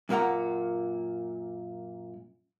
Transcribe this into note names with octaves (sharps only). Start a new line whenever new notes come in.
F#2 A#2 A#3 F#5 A#5